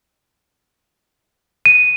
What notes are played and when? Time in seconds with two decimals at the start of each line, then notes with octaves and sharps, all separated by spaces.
1.66 D#7